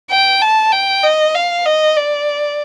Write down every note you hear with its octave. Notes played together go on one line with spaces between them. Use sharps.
G5
A5
G5
D#5
F5
D#5
D5